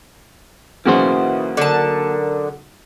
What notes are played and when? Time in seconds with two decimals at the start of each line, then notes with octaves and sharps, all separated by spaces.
0.86 B1 C#3 E3 A#3 F#4 C5
1.57 D3 A#4 A5